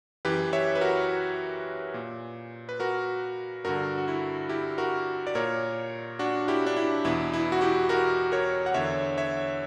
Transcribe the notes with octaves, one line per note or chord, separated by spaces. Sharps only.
F#2 E3 G4 B4
C#5 E5
B4
F#4 A#4
A#2
B4
F#4 A#4
G2 D3 F#4 A#4
F#4
E4
E4 G4
F#4 A#4
D5
A#2 A#4 C#5
D4 F#4
E4 G4
D4
E4
E2 B2 E4
E4
F#4
E4 G4
F#4 A#4
A#4 C#5
F#5
E2 D3 C#5 E5
C#5 E5